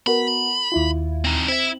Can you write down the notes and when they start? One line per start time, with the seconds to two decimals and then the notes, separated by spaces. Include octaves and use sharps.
0.07 B3 F#4 A#4 B5
0.72 D#2 E4 F4
1.25 C4 D#4
1.48 C4 E4 E5